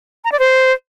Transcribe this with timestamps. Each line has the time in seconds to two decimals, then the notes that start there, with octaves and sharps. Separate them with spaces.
0.24 A#5
0.32 D5
0.39 C5